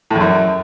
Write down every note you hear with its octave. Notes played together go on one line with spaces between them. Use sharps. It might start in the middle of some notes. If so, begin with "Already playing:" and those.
A2
E2
F#2